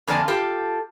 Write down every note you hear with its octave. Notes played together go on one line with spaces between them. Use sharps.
F2 D3 A#3 D5 G#5
F4 G4 A4